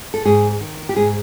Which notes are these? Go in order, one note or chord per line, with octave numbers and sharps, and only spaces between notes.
A4
G#2 G#4
D#3
G4
G#2 G#4